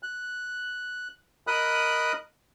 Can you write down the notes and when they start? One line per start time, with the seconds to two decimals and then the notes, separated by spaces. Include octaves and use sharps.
0.03 F#6
1.47 A#4 D#5 B5 D#6 F#6